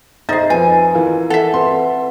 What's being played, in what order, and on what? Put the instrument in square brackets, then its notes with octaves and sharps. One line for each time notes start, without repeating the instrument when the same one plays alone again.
[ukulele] D#4 G#4 [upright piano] C5 D#5 A6 [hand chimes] E5
[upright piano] F2 [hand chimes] B4 [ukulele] G#5
[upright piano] E3 F4 A#4
[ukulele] A4 E5 [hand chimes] F#5
[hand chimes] C4 B4 [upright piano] C6